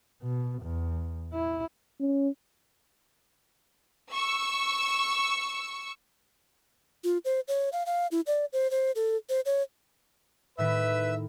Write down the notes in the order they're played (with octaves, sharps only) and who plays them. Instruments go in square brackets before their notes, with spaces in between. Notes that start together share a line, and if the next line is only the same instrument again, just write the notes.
[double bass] B2
E2
E4
[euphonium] C#4
[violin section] C#6 E6
[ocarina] F4
C5
C#5
F5
F5
E4
D5
C5
C5
A4
C5
C#5
[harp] A2 D#3 E4 [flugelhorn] B4 [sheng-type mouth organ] E5 E6